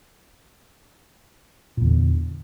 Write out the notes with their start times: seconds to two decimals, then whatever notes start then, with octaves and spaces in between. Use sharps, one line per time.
1.77 A#2
1.81 E2
1.86 D3